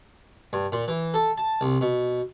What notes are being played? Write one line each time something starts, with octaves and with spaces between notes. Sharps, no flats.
G2
A#2
E3
A4
A5
C2
B2